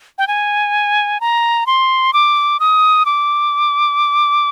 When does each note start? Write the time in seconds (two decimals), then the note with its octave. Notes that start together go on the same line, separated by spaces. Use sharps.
0.18 G5
0.28 G#5
1.21 A#5
1.67 C6
2.13 D6
2.60 D#6
3.06 D6